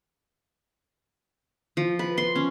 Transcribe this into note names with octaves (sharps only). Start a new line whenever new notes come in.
F3
B4
C6
C#4